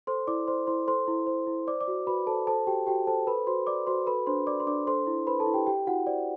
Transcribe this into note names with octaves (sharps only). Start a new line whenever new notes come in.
A4 C5 C6
E4 D5 D6
C5 D5 C6
E4 C5 C6
A4 C5 C6
E4
C5
E4
C5 D5 D6
D5 D6
F#4
F#4 B4 B5
A4 C5 A5
A4 C5 A5
F#4 G4 G5
F#4 G4 G5
A4 C5 A5
A4 B4 B5
F#4 C5 C6
D5 D6
F#4 C5 C6
A4 B4 B5
D4 C5 C6
D5 D6
C6
D4 D5 D6
A4 C5 C6
E4
B4 C5 B5
A4 A5
E4
G4 G5
G4 G5
E4 F#4 F#5
C5 D5